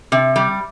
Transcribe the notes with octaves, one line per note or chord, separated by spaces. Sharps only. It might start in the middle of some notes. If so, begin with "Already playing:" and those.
C3
G3